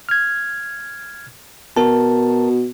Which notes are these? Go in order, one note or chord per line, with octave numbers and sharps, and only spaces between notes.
F6 G#6
B2 F#4 A#4 A5